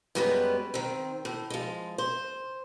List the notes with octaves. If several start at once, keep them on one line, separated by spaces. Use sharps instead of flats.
F#2 G3 G#3 B3 E4 B4
D#3 C4
A2
F3 G#3
C5